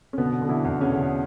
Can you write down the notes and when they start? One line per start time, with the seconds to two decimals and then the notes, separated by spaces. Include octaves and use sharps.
0.13 C#4
0.18 B2 D3 B3
0.42 D3
0.49 E3 E4
0.65 E2
0.81 C#3 C#4
0.89 D3